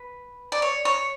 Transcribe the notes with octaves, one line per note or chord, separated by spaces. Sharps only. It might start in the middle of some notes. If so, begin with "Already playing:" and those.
Already playing: B4
D5
C#5
C#5